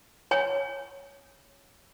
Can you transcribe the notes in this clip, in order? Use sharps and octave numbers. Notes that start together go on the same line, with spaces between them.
C#5 G#5